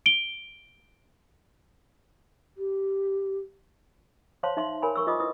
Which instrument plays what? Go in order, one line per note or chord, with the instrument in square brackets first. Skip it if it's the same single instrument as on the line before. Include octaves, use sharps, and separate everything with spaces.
[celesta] D7 G7
[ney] G4
[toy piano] C5 C#5 F5 A5 C6
D#4 E5 C6
A#4 C#5 G#5 B5
A#4 C#6 E6
F4 C5 D#5 D6 D#6
E4 B4 D#6